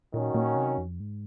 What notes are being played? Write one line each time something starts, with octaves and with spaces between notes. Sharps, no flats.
A#2 D#3 F#3 C#4 F#4
A#2
C3
F2
G#2